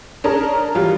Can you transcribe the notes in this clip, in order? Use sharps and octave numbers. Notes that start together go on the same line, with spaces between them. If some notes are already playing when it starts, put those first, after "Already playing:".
C#4 D4 G#4 A#4 A5 A#5
E3 F#3 G3 F4